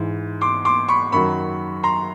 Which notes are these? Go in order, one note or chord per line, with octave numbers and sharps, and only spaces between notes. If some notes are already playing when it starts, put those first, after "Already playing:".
Already playing: G#2 E3
C6 D6
C6 D6
B5 C#6
F#2 D#3 F#3 B5 C#6
A#5 C6